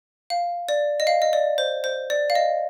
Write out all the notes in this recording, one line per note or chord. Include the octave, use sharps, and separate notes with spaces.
F5
D5
D#5
F5
D#5
D5
C5
C5
D5
F5
D#5